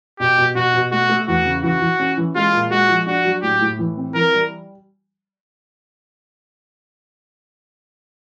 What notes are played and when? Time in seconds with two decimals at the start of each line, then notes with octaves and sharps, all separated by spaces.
0.20 B2 G4
0.38 B2
0.55 B2 F#4
0.74 B2
0.91 A3 F#4
1.09 A3
1.27 E2 F#4
1.45 C#3
1.63 E3 F#4
1.82 E3
1.99 C#4
2.17 E3
2.35 G#3 F4
2.53 A#2
2.71 G#3 F#4
2.88 F3
3.06 D4 F#4
3.25 F#3
3.43 A2 G4
3.61 A2
3.79 E3
3.97 C4
4.15 E3 A#4
4.33 G3